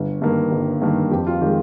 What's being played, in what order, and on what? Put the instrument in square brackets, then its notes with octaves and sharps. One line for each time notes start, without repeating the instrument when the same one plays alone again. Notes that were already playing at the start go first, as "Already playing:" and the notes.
Already playing: [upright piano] G1
G2 D#3 A#3
G1
G2 D#3 A#3
F2 G4
F4
D#3 G#3 G4